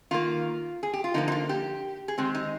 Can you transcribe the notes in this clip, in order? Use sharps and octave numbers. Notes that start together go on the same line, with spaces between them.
D#3 A#3 F4
G#4
G4
F4
D3 F3 A#3 D#4
D#4
F4
G4
G#4
D#3 G#3 C4 G4
D#4